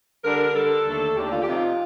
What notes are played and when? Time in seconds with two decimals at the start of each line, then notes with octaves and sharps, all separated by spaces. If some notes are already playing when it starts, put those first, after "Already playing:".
0.23 D3 G3 D4 A#4
0.54 D3 G3 D4 A4
0.85 D#2 D3 A3 D4
1.16 D#2 D3 A3 D4 G4
1.31 F4
1.41 G4
1.47 C3 F3 C4 D#4 F4